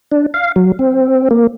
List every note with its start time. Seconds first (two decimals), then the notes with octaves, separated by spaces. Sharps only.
0.12 D4
0.34 F5
0.56 F#3
0.79 C4
1.31 A#3